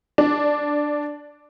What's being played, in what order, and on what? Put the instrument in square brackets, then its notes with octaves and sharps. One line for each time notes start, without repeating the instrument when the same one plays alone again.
[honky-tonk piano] D4